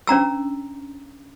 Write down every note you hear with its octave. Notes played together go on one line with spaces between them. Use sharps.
C#4 D4 A#5 E6